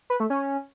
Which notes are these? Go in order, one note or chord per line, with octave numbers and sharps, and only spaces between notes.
B4
A3
C#4